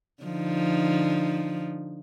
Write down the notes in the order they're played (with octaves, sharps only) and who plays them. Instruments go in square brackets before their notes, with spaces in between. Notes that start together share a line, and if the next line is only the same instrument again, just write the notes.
[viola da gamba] D3 F3 D#4